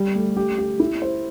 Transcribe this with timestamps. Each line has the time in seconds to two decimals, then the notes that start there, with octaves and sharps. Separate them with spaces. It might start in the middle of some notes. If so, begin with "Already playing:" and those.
Already playing: G3 G4
0.15 A3
0.37 G4
0.58 G4
0.80 E4
1.02 C5